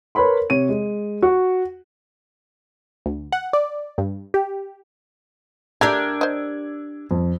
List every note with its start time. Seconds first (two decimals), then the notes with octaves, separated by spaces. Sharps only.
0.15 A#4 B4 C#5 B5 C6
0.50 C3 C#5 D#7
0.69 G#3
1.22 F#4
3.06 D2
3.32 F#5
3.53 D5
3.98 G2
4.34 G4
5.81 A3 D4 G4 A#4 E6 G#6
6.21 C5 D#5
7.11 F2